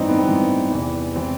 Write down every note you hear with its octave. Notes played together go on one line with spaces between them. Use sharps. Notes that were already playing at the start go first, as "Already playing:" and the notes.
Already playing: A1 G2 E3 C4 D#4
B3
C4
A1 G2 E3 B3
E2 C3 E3
C3 E3 C4